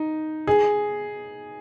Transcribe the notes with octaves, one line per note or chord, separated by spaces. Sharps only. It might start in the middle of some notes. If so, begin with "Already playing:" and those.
Already playing: D#4
G#4